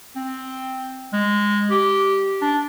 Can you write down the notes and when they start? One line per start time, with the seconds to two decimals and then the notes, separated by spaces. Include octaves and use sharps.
0.16 C4
1.13 G#3
1.71 G4
2.42 D4